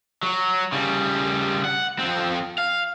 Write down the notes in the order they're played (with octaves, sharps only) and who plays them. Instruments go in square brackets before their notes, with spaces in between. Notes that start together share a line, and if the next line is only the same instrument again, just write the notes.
[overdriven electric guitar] F#3 F#4
C#3 G3
F#5
F2 C4
F5